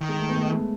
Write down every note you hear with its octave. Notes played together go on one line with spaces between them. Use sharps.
D#3
G#3
A3
B3
A3
G#3